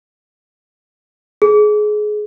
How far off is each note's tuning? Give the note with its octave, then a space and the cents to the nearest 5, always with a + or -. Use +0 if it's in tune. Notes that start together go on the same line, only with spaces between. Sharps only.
G#4 +25